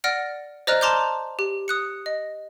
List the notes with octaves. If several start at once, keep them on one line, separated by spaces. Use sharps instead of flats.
D5 F#5 F6 A#6 D7
C5 D5 D#5 A#5 F6 F#6
A5 A#5 C6 D6 F6 G6
G4
D#6 F#6 C#7
D#5